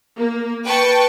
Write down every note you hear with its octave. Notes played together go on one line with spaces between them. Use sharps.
A#3
B4 G5 A5 C#6